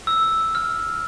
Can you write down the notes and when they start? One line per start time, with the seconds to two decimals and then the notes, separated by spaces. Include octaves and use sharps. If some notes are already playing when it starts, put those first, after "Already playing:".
0.07 E6
0.55 F6